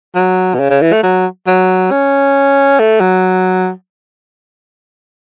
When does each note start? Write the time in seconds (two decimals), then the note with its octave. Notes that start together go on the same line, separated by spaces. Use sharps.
0.15 F#3
0.54 B2
0.60 C#3
0.70 C#3
0.82 E3
0.93 A3
1.03 F#3
1.47 F#3
1.91 C#4
2.79 A3
3.01 F#3